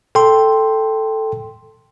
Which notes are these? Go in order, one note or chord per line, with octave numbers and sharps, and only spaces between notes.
A4 G5 C6